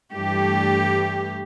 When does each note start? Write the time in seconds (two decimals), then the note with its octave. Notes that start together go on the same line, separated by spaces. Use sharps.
0.12 G2 E3 A3 G4